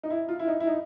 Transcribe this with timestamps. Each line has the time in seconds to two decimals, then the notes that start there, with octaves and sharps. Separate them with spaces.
0.03 D#4
0.10 E4
0.29 F4
0.39 E4
0.47 D#4
0.60 E4
0.67 D#4